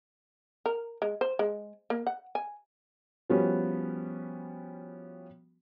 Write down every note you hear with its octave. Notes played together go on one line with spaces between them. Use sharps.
A#4
G#3
C5
G#3
A#3
F#5
G#5
F3 G3 B3 C#4 F#4